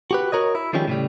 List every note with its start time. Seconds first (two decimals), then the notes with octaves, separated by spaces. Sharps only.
0.11 F#4 G4 B4
0.32 F#4 A#4 C#5 D#5
0.55 E4
0.73 D#3 F3 G3 G#3 C#4 G4
0.88 A2 C#3 G3